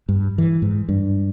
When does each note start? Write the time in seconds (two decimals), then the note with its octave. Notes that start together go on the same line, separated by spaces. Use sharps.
0.09 G2
0.38 E3
0.62 G#2
0.89 G2